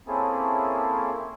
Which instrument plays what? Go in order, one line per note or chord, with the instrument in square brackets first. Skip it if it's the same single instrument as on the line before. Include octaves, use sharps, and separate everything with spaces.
[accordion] A#3 C4 C#4 E4 G#4 A4